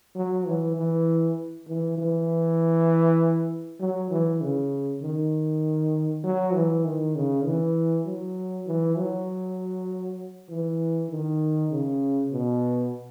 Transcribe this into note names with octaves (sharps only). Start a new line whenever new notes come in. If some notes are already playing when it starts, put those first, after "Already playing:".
F#3
E3
E3
E3
E3
F#3
E3
C#3
D#3
F#3
E3
D#3
C#3
E3
F#3
E3
F#3
E3
D#3
C#3
B2